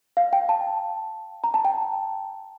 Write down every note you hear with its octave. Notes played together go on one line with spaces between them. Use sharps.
F5
G5
A5
A#5
A5
G5